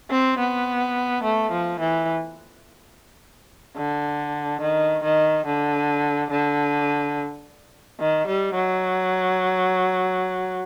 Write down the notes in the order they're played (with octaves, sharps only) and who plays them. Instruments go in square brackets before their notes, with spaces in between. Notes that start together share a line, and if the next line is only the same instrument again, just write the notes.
[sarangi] C4
B3
A3
F3
E3
D3
D#3
D#3
D3
D3
D#3
G3
F#3